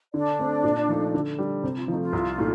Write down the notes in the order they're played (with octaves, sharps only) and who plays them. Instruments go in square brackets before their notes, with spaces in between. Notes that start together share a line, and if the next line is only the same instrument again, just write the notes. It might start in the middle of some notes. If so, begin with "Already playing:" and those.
[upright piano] D3 [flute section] D4 D5
[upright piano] A3 C4
A#2
F3 A3 D#4
D3
G3 D4
[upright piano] C3 [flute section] C5
[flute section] F4
[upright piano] F3 A3 [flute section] D#4
[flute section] F4
[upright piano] C2
A#2 A3 D#4